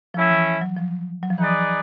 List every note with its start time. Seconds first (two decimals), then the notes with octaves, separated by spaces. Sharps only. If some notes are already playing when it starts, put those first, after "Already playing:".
0.14 F3 A3 C#4 E4
0.30 E3
0.61 F#3
0.76 F3
1.23 F#3
1.30 F3
1.38 E3 D#4 G#4 B4 D5